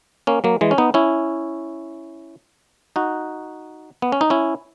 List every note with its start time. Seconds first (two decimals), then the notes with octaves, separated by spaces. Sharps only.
0.27 A#3 C#4
0.44 F#3 A#3
0.61 E3 G#3
0.71 C#4
0.78 B3 D#4
0.94 C#4 E4
2.96 D#4 F#4
4.02 B3
4.12 C#4
4.21 D#4
4.30 C#4 E4